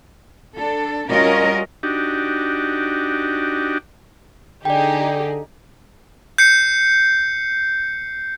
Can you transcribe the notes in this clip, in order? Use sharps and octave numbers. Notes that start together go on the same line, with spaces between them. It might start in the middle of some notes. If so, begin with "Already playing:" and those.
D4 A4
G3 C#4 F4 F#4 A#4 D#5
D4 D#4 F#4 G4
D3 D#4 G4 G#4 D5 G5
G6 C7 C#7